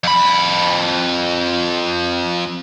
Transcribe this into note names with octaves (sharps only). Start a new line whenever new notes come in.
F2 B5